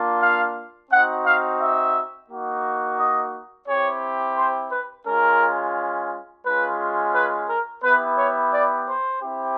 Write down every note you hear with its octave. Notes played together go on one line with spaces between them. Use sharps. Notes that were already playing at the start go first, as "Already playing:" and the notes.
Already playing: A#3 D4 F4
F5
C4 D#4 F#4 F#5
F5
E5
A#3 D#4 F#4
D#5
C4 E4 G4 C#5
C5
B4
G#3 C#4 F4 A#4
G#3 C#4 F4 B4
B4
A#4
B3 E4 G4 B4
C#5
D5
C5
C4 E4 G4